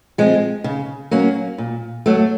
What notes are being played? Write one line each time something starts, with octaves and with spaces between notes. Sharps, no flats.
F3 G#3 C4
C#3
F#3 A#3 C#4
A#2
F#3 A3